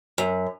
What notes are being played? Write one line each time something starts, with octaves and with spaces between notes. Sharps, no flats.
F#2